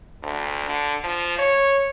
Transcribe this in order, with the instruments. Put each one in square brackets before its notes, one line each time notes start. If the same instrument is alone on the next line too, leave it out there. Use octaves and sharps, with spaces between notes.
[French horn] D2
D3
F3
C#5